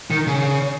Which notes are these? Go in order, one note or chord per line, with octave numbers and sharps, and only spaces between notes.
D#3
C#3